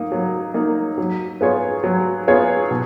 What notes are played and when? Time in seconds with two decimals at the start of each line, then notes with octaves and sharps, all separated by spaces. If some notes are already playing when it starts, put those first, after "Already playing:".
Already playing: A#3 D#4
0.12 F#3
0.54 A#3 D#4
0.98 F#3
1.41 B3 F4 G#4 C#5
1.84 F#3
2.28 B3 F4 G#4 C#5
2.71 B2